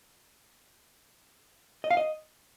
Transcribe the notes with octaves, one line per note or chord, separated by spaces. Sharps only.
D#5
F5
D#5